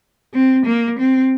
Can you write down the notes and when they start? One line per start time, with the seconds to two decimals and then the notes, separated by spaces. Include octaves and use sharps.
0.33 C4
0.66 A#3
0.99 C4